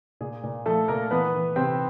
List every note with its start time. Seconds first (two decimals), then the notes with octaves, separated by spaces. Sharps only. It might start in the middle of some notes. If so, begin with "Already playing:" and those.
0.21 A#2 G#4
0.43 A#2
0.66 F3 A3 A4
0.88 A#2 A#3 A#4
1.11 E3 B3 B4
1.34 E3
1.56 C3 C4 C5